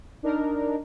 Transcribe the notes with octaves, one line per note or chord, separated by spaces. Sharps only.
D4 D#4 A#4